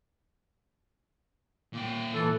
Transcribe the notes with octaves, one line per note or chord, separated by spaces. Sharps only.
A#2 G5
E3 A4